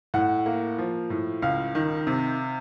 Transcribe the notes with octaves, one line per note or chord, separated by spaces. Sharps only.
A2 F#5
A#3
F3
A2
C#2 F5
D#3
C3